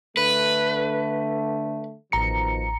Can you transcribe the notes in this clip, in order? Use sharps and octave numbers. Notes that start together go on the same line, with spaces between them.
D3 A3 B4
A1 B2 D#3 F3 A#5 C#7